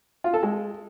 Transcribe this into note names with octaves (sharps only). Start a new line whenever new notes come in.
F4
A4
G#3